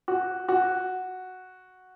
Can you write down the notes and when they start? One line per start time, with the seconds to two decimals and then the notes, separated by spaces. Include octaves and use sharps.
0.08 F#4
0.48 F#4